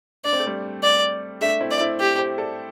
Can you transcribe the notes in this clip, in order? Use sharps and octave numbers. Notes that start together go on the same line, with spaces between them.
D4 D5
C4
A3
G3 C4
D5
A3 D4 E5
C4 E4
D5
C4 E4
G4
G4 C5
A4 D5